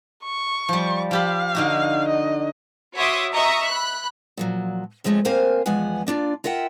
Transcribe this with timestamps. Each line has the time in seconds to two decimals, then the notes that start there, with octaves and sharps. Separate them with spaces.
0.24 C#6
0.69 F3 G3
1.11 F3 G4 F5 B5
1.55 D3 D#4 F#4
2.08 D#5
2.96 F#4 C#5 E5 C6 D6 D#6
3.33 D#5 E5 A#5 C#6 D#6
3.67 B5 F#6
4.37 A#2 F3 F#3
5.04 F2 F3 G#3 A3 C#4
5.25 A#3 C4 A#4 C5 F5 G#5
5.66 E2 F3 G#3 B3 F#5 G#5
6.07 A#3 D4 F4 D5
6.44 F4 A#4 E5 F#5 G5